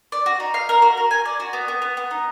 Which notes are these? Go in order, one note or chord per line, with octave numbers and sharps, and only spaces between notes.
D5
F#4
D#4
F5
A#4
F#4
A#4
G#5
D5
F#4
B3
B3
B3
B3
D#4